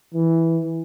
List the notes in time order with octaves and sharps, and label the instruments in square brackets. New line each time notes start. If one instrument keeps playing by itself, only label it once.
[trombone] E3